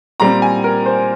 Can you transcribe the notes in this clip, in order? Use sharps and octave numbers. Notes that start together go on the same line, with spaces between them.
A#2 G3 C4 A#5
G#5
A#4
C5